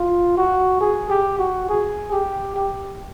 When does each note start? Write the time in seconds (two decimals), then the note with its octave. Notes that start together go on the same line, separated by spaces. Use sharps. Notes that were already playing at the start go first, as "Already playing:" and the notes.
Already playing: F4
0.37 F#4
0.80 G#4
1.10 G4
1.39 F#4
1.68 G#4
2.12 G4
2.56 G4